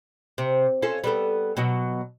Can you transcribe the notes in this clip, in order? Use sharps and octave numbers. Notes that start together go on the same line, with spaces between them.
C3
C#4 F4 A4
G3 B3 A4
B2 F#3 F#4